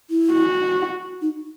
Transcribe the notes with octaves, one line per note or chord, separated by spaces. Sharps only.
E4
F#4
D#4